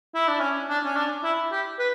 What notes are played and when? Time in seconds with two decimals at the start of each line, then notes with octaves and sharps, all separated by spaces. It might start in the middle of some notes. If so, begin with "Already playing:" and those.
0.15 E4
0.28 D4
0.41 C#4
0.69 D4
0.85 C#4
0.96 D4
1.24 E4
1.51 G4
1.79 B4